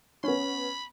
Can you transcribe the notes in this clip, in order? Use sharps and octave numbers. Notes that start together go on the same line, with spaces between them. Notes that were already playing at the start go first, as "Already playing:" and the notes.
B3 C#4 B5